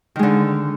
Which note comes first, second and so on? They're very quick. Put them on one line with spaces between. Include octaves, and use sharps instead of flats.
D#3 G#3 D3